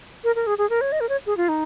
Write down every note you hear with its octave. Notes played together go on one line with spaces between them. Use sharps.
A#4
A#4
G#4
G#4
A#4
C#5
D#5
A#4
C#5
G#4
F4
D#4